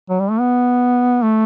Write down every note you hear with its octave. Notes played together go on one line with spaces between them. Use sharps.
F#3
G3
A3
B3
A3